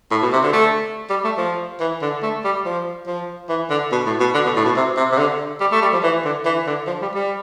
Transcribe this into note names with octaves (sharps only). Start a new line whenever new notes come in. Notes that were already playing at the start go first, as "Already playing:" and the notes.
A2
B2
C3
D3
A3
G3
A3
F3
E3
D3
A3
G3
F3
F3
E3
D3
B2
A2
B2
D3
B2
A2
B2
C3
C3
C3
D3
G3
A3
G3
F3
E3
D3
E3
D3
F3
G3
G3